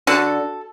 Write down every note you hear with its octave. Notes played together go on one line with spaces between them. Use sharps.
D3 F#4 A4